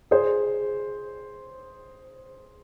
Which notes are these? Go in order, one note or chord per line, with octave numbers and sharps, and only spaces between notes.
G#4 C5